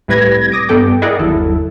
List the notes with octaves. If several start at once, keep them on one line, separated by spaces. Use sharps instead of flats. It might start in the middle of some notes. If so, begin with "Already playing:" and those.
C2 A2 G3 B4 G#6 A#6
D6 D#6 A#6
G2 B3 A4 G5 D6
E4 G#4 A#4 D5 D#5 F#5
G1 D#2 F#3 E4 A4